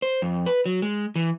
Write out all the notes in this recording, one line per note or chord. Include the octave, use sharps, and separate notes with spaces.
C5
F2
B4
F#3
G#3
E3